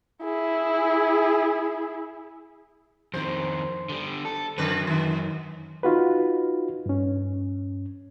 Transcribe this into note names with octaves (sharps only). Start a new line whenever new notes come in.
E4 G#4
F2 D#3 C5
D3 G3
A4
F#2 D3 B4
D#3
D#4 F4 F#4 B4
G2 C#4